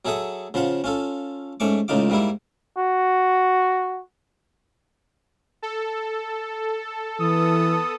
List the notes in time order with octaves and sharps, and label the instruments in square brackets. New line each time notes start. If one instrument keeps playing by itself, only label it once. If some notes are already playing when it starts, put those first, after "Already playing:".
[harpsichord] F#3 G#4 A4 E5 F#5 D#6
C#3 F3 F4 F#5
C#4 F4 A4
G#2 A3 C#4 C#6 D6
C#2 A2 C#3 D#4 F4 D6
G#2 G3 A#3 E4
[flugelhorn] F#4
[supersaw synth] A4
[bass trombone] E3 [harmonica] B3 D#6